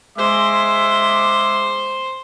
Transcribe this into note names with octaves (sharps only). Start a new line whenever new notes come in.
G#3 C5 E5 D6